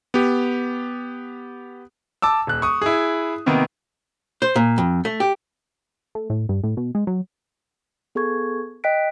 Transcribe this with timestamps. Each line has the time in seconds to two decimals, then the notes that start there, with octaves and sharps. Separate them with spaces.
0.14 B3 G4
2.22 A5 D6 E6
2.47 D#1 F#6
2.62 C#6 D#6
2.82 E4 G#4
3.46 C3 D#3 A#3 B3
4.42 C5
4.56 A#2
4.78 F2
5.05 A3
5.20 G4
6.15 A3
6.30 A2
6.49 G2
6.63 A2
6.77 B2
6.95 G#3
7.07 F#3
8.15 B3 G#4 A4 C#6 G#6
8.84 D#5 G5 F#6 B6 D7